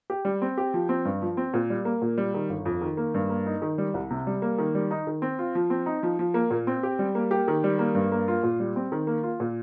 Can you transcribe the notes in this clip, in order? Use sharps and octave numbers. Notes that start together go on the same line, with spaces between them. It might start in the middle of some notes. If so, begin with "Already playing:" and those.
G4
G3
C4
G4
F3
C4
G2
F3
C4
A#2
G3
A#3
A#2
G3
D#3
G1
F2
D#3
A#3
G2
A#3
D#4
D#3
G3
C2
C3
G3
A#3
D#3
G3
D#4
D#3
C4
F4
F3
C4
D#4
F3
F3
A#3
A#2
C4
G4
G3
A#3
G4
D#3
G3
A#3
G2
A#3
F4
A#2
G3
C4
D#3
A#3
F4
A#2